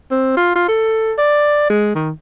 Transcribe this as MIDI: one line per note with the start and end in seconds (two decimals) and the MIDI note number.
0.11 0.34 60
0.37 0.53 65
0.55 0.67 65
0.68 1.13 69
1.18 1.70 74
1.70 1.91 56
1.95 2.11 51